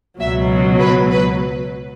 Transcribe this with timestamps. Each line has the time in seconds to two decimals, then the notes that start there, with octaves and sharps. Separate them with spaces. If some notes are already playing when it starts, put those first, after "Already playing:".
0.20 C#2 B2 F#3 E5
0.80 B4
1.11 B4